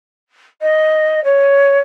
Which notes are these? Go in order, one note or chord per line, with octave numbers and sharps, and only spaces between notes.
D#5
C#5